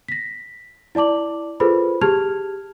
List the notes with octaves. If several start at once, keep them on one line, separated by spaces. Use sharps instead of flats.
A#6 B6
E4 D5 A5 D6 F#7
F4 G#4 A4 B4 C5 B5
G4 G#4 A5 F6 G#6 F7